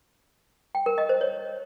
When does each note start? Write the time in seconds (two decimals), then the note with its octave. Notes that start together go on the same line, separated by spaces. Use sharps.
0.75 G5
0.86 A#4
0.98 D#5
1.09 C5
1.21 C#5